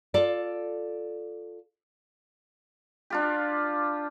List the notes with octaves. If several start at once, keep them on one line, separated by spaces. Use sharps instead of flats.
F4 A4 D5
D4 F4 G4